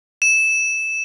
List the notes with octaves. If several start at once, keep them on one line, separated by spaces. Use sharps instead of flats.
E7